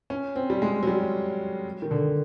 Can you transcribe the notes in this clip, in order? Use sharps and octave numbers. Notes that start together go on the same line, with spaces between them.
C#4
C4
G3
G#3
F#3
G3
D#3
D3